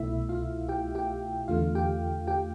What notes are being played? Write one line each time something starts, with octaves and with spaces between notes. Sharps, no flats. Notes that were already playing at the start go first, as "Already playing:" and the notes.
Already playing: C2 B2 A3 E4 E5
F4 F5
G4 G5
G4 G5
E2 D3 A3 F4 F5
G4 G5
G4 G5